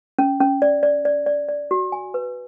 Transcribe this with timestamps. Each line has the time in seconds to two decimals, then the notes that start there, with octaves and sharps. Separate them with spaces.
0.19 C#4
0.41 C#4
0.62 D5
0.83 D5
1.05 D5
1.26 D5
1.49 D5
1.71 F#4
1.92 G#5
2.14 B4